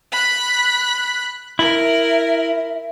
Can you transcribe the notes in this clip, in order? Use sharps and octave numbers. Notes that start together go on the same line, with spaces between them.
B5 F#6
E4 A#4 E5